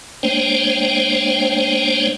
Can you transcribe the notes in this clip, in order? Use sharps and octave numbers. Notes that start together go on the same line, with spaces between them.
G#3 A#3 D4 C5 C#5 G5